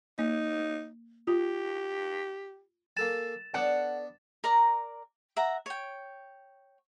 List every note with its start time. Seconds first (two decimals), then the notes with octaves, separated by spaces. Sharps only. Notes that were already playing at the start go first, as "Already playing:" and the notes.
0.19 A#3 D#4
1.28 F4 G4
2.97 A#3 A4 G#5 A6 E7
3.54 B3 D4 A4 C#5 D5 F#5
4.44 A#4 D5 A#5
5.36 E5 F#5 A#5
5.66 C#5 G5